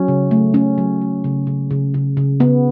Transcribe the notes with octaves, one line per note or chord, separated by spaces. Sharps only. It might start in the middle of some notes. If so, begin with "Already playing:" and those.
Already playing: F#3 C#4
C#3
A3
A3 C#4
F#3
A3
C#3
C#3
C#3
C#3
C#3
C#3 B3